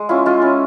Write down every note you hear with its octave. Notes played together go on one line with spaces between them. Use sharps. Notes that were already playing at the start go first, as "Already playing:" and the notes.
Already playing: G#3
C#4 E4 F4
G#3 F4
C#4 E4